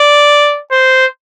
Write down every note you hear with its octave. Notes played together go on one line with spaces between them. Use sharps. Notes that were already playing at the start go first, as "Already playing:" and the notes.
Already playing: D5
C5